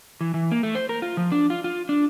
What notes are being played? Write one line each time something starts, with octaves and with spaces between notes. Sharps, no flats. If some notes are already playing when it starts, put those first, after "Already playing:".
E3
E3
A#3
A3
C5
A#4
F4
F3
D4
F4
F4
D4